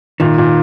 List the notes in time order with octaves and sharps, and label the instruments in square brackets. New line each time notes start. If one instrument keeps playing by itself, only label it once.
[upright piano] A#2 [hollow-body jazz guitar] D#3
[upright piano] A#2